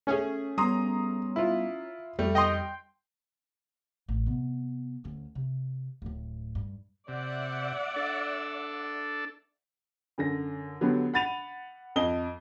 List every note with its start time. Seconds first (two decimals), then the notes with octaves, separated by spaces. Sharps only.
0.07 A3 C#4 G#4
0.58 G3 B3 A#5 C6 D#6
1.36 E4 F4
2.19 F2 G3 A3
2.35 D#5 G5 C6
4.09 A1
4.26 C3 B3
5.04 D2 C#4
5.35 C3
6.02 D1 A2
6.55 G2
7.08 C3 D5 E5 F#5
7.96 D4 A4
10.18 F#2 D3 A#6
10.81 D3 F#3 B3 G4
11.14 F#5 B5 A6 D#7 F7
11.96 F2 D#5 G7